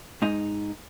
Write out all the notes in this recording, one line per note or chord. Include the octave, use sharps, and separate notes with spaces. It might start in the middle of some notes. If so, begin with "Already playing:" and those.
G#2 D#4